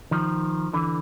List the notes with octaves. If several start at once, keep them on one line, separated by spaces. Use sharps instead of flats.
D#3 F3
D3 E3